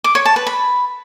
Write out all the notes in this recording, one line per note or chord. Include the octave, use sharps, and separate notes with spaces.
D6
C#5
A5
B4
B5